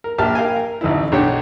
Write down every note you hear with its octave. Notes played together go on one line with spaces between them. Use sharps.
A#4
A#1 G4 E5 A5 F6
A#4 F5 G5 G#5
A#4
A1 D2 D#4 E4
B1 D4 G4 C#5 G5